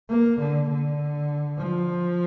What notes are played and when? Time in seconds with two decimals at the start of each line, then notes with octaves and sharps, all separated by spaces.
0.10 A#3
0.40 D3
0.70 D3
1.58 F3